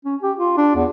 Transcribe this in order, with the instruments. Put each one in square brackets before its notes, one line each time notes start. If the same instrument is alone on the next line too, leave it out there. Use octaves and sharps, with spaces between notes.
[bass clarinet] C#4
G4
F4
D4
E2